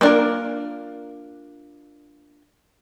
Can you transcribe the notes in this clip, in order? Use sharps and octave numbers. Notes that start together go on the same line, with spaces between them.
A#3 B3 D4 F4 A#4